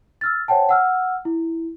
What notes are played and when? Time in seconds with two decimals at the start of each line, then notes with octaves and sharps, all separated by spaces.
0.21 E6 F6 A6
0.48 C5 C#5 F#5 G5 A5
0.69 F#5 E6 F6
1.25 E4